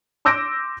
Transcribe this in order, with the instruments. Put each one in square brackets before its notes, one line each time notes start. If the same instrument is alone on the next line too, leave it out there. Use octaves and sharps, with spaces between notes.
[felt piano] C6 D6 E6 G6 A#6 D7